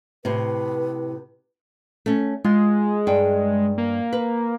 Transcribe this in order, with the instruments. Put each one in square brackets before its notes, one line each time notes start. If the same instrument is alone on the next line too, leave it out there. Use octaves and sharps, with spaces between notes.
[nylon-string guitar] A2 C3 [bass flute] B4
[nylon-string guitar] A3 C#4
[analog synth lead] G#3 [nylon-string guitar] F4
[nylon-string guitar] G2 G5
[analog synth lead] A#3
[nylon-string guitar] B4